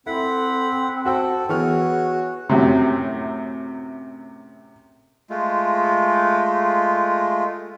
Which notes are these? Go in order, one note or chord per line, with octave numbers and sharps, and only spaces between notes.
C4 E4 A4 F#5 B5
F#4 A4 C5 F#5 G5
E3 B3 F#4 G#4 C#5 F6
F#2 A2 C3
G#3 A3 F4